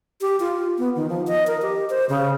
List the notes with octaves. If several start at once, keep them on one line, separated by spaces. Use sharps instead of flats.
G4
F4
B3
D#3
F3
D#5
A#4
G4
C5
C#3